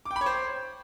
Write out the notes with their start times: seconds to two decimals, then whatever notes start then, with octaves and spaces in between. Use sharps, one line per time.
0.06 D6
0.11 G5
0.16 B5
0.21 C#5
0.26 C5